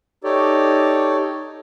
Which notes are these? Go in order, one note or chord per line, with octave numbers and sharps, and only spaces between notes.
D#4 G4 A4 C#5 D5